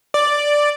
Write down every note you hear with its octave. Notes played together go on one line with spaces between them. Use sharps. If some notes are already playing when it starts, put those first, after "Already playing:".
D5